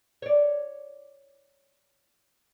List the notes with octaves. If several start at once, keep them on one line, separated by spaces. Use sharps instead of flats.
C#5 D5